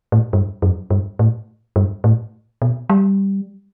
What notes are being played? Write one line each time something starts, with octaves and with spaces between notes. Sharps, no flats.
A2
G2
F#2
G2
A2
G2
A2
B2
G3